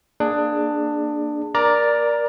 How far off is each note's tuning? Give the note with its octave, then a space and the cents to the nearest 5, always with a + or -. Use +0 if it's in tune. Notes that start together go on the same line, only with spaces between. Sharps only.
A#3 +0 D4 +15 G#4 +0
A#4 +20 D5 +0 A#5 +0